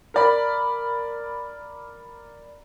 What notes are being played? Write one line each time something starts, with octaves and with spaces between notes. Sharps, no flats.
A#4 D5 B5